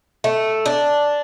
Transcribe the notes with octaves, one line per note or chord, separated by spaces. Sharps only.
A3
D4